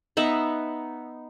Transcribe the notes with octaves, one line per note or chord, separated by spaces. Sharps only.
B3 D#4 E5 F#5